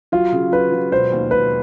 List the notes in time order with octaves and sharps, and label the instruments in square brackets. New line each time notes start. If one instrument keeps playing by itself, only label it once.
[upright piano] F#3 [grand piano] F4
[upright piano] C#3
[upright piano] F#3 [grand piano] B4
[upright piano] F#3
[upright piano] E1 [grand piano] C5
[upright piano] D#2
[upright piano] E1 [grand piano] B4